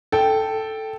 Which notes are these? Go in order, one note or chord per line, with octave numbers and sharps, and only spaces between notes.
A4 G5